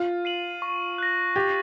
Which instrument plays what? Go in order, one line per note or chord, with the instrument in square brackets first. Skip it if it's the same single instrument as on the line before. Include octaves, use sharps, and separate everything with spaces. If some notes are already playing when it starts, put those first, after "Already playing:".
Already playing: [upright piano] F4
[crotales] C7 D#7 F#7
C#6
F#6 A#6
[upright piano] G4 [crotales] A6